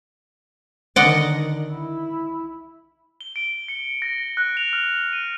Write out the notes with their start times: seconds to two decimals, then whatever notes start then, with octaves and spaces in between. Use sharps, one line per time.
0.96 D3 D#3 D5 D#5 F#5
1.71 E4
3.21 G7
3.36 D7
3.68 C#7
4.02 A#6
4.37 F#6
4.57 F7
4.73 F6
5.13 D#7